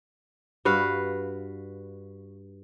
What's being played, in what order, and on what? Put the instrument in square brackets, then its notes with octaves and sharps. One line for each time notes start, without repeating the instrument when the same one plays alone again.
[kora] G2 F#4 B4 F5